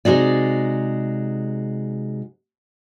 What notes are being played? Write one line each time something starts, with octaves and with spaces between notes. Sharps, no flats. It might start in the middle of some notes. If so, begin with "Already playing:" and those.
C3 G#3 D#4 F#4 D5